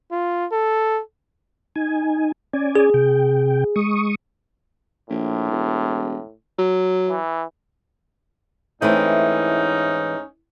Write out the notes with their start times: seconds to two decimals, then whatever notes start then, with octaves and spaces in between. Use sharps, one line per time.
0.11 F4
0.52 A4
1.76 D#4 G#5
2.53 C#4 D5 G#5
2.76 G#4
2.94 C3 G5
3.76 G#3 C#6 D#6
5.10 A#1 A2
5.51 E1
6.58 F#3
7.09 E3
8.82 G#2 E3 A3 C4 C#4 D#4